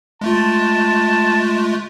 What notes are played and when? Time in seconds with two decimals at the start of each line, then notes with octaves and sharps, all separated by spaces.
0.21 G#3 A3 F4 A5